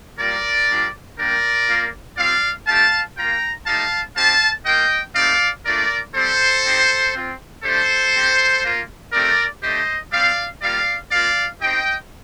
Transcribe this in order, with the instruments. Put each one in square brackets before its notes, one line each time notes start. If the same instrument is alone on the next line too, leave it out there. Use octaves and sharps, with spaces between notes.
[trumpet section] G3 A#3 F4 A#4 D5
G3 D4 F4
G3 A#3 D4 G4 A#4 D5
A#3 F4
G3 C4 F4 D5 F5
A3 D#4 G4 F5 A5
A#3 F4 G5 A#5
A3 D#4 G4 F5 A5
C4 D#4 G4 F5 A5
A#3 F4 D#5 G5
A3 C4 D#4 G4 D5 F5
A3 D4 F4 A#4 D5
G3 C4 G4 A4 C5
C4 D#4 G4
C4 F4
A3 D4 G4 A4 C5
C4 G4
A#3 F4
A3 C4 D#4 G4 A#4 D5
A3 D4 G4 C5 D#5
G3 C4 G4 D5 F5
G3 A#3 F4 D5 F5
A#3 F4 D5 F5
C4 D#4 G4 D#5 G5